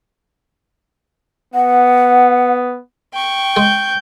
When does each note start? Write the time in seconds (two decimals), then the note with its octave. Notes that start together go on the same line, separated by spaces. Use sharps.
1.54 B3 F#5
3.14 G5 C#6
3.57 G#3 G6